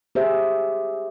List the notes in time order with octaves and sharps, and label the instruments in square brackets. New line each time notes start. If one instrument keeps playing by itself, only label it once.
[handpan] G4 G#4 C5 E5